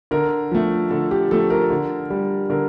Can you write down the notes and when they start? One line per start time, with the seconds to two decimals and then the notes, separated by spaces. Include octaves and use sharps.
0.11 D3 A#4
0.51 F3 A3
0.91 D3 A4
1.11 G4
1.31 F3 A3 A4
1.50 A#4
1.70 D3
2.10 G3
2.50 D3 A#4